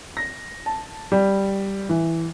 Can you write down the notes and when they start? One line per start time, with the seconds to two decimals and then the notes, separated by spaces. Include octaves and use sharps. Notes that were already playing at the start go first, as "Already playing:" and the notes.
0.17 A#6
0.66 A5
1.12 G3
1.89 E3